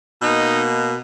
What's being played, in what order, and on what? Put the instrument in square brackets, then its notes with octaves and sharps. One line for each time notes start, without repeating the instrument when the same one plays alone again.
[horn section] B2 A#3 D#4